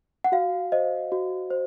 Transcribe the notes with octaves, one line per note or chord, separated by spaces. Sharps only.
F#5
F#4 F5
C5 D#5
F#4
C5